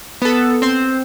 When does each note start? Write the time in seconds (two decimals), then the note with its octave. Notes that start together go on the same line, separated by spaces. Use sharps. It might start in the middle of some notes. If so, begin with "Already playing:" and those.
0.22 B3 A4
0.62 C4 C5